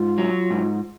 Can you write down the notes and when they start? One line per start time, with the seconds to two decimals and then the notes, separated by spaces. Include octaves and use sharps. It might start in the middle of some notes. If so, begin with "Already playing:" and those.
Already playing: G#2 F4
0.18 F#3
0.50 G#2